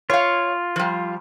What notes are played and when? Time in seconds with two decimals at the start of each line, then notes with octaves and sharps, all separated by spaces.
0.10 F4 C#5 F5
0.76 F3 G3